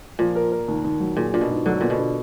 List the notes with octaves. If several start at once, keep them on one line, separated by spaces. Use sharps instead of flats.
A#2 F3
A#4
A#4
D#2
D#2
F#3
A#2 G#4
A#2 D4
B2
G#2
D3 F#3
A#2 B3
B2
D4